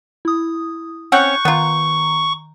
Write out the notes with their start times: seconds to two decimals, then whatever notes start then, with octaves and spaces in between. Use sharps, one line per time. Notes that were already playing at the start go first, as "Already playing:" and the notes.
0.25 E4 D#6
1.12 C4 C#4 F#5 C#6 F#6 G6 C#7
1.45 D#3 B3 F4 A#5